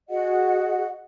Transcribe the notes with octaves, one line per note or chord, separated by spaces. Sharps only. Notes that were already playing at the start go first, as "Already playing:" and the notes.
F#4 G#4 D#5 F#5